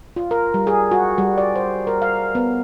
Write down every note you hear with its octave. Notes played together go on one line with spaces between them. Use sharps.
F4
A#4
G3
G#4
F#4
G3
D5
C5
A#4
F5
B3